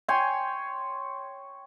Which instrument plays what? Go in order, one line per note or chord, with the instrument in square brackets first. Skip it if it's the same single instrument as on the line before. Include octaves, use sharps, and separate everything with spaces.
[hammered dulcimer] C#5 G5 G#5 C6